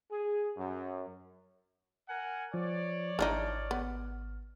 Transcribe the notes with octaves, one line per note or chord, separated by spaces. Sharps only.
G#4
F#2
A#4 F#5 G#5
F3 C#5 D5
G#1 E3 D4 D#4 F6
B3